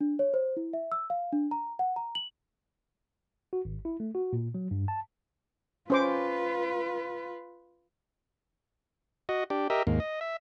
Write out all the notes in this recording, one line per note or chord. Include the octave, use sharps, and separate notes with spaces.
D4
C#5
C5
E4
E5
E6
F5
D4
A#5
F#5
A#5
F#7
F#4
G#1
E4
A3
F#4
A#2
F#3
G2
A5
C#4 F4 B4 C5 D6
F#4 D#5
D4 G4
G4 A#4 D#5 E5
D#2 G#2 A#3
D#5
E5